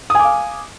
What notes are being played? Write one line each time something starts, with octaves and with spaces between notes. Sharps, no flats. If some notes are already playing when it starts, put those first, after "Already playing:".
F5 G#5 D6 D#6